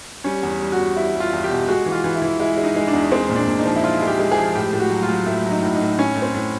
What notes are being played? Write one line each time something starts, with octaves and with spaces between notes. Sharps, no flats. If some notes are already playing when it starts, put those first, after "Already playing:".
G3 C#4
E2
G3
F#4
E2
G3 E4
G3
F4
E2
G4
B2
G#3 F#4
E3
F4
E3
E4
E3
G#3 E4
G#3
D#4
G#3
D4
E2
G#3 C4
A#2
D4
A#2
D#4
F3
E4
F3 F4
G#3
G4
G#3
G#4
F3
A2 G4
A2
F#4
F#3
F4
F#3
A2 E4
F#3
D#4
A2
D#4
A2
A2 C#4
A2
C4
A2